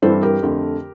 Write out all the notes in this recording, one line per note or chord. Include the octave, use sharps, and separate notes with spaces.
G2 E3 G3 C4 A4 C5
G4 A#4
F2 D3 A3